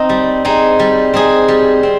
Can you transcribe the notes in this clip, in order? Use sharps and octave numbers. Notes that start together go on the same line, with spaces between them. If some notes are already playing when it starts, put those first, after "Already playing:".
Already playing: C4 D#4
G3
C4 D#4 G#4
G3
C4 D#4 G#4
G3
C4